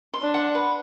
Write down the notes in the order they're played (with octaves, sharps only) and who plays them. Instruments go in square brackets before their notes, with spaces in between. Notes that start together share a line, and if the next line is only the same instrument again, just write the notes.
[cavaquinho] C6
[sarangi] D4
[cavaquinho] F#5
B4